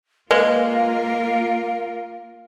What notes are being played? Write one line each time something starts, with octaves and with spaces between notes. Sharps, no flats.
G#3 A#3 F4 A#4 B4 F5